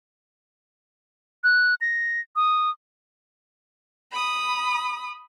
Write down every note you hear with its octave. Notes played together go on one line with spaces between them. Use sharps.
F#6
A#6
D#6
B5 D#6